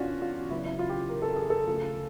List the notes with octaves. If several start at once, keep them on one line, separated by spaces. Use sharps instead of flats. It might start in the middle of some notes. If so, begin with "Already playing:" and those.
Already playing: E2 C3 E3 C#4 D4 F4 F#4
F4
C#3 F#3 B3 E4
E4
F4
G4
A#4
A4
G#4
A4
C#3 F3 A3